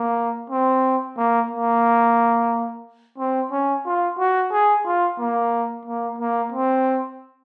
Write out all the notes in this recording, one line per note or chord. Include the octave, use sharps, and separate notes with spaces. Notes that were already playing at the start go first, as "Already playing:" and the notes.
Already playing: A#3
C4
A#3
A#3
C4
C#4
F4
F#4
G#4
F4
A#3
A#3
A#3
C4